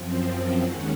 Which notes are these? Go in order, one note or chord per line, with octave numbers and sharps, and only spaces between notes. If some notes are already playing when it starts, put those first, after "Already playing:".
Already playing: F#2 F3 C4
D#2 D#3 G#3 C#4 F#5